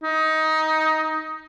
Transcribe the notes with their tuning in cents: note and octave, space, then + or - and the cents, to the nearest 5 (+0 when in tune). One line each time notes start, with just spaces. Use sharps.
D#4 +15